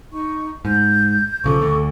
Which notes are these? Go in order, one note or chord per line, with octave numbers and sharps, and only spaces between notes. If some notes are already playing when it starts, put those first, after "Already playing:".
D#4 C#6
G#2 G6
B1 C#3 F3 A4 C#6 D6
D2 D3